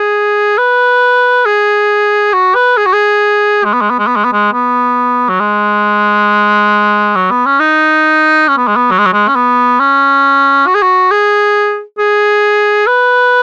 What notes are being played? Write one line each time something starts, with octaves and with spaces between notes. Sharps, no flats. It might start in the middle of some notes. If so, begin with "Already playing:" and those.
Already playing: G#4
B4
G#4
F#4
B4
G#4
F#4
G#4
G#3
B3
G#3
B3
G#3
B3
G#3
B3
G#3
B3
F#3
G#3
F#3
B3
C#4
D#4
C#4
B3
G#3
B3
F#3
G#3
F#3
G#3
C#4
B3
C#4
F#4
G#4
F#4
G#4
G#4
B4